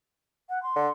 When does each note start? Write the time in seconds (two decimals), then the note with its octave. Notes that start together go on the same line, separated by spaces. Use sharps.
0.49 F#5
0.63 C6
0.76 D3